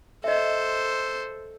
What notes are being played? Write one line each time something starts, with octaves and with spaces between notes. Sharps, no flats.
A4 C5 D#5 E5